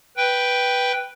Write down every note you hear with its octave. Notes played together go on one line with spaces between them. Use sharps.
B4 G5